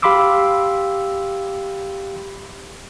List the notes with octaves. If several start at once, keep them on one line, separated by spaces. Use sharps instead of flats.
G4 F5 B5 C6 D6 E6